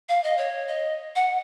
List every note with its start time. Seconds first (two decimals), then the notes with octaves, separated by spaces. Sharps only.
0.09 F5
0.23 D#5
0.37 C#5
0.68 D#5
1.16 F#5